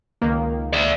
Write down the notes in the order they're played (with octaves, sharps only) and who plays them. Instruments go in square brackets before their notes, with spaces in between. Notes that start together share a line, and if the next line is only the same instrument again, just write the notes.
[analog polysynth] C#2 D#3 A#3
[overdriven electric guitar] D5 E5